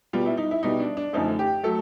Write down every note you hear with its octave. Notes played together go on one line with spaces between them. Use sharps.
B2 G3 F4
E4
D#4
E4
B2 G3 D#4
D4
D4
F#2 D3 F3 A3 D#4
G4
F#3 A3 A4